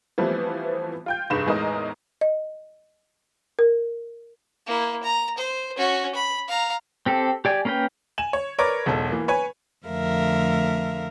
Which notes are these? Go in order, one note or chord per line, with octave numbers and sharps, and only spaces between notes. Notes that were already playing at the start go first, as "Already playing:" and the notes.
E3 F3 G3 A3 B3 C4
F4 G5 G6
F1 G2 D#4 G#4 E7
E2 A2 G#3 D#4 A#4 D#5
D#5
A#4
A#3 E4
A#5
C5
C#4 F#4
B5
F5 A#5
C4 G4 A4
G4 D5 G#5
A#3 C#4 A#4 B4 G5
G#5 E7 F#7
C#5
A#4 B4 C#5 D5 D6
E1 B1 A4
E3 A#3
B4 C#5 G#5
F2 D3 A3 A#4 E5 F5